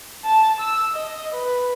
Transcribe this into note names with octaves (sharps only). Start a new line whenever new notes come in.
A5
E6
D#5
B4